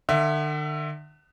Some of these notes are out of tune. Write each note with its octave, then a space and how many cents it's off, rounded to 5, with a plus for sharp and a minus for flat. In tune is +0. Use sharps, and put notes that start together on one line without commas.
D3 +45 E5 +20